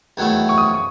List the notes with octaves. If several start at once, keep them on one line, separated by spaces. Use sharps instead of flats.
E2 D#3 F#3 A3 E4
C#6
D#6
C#6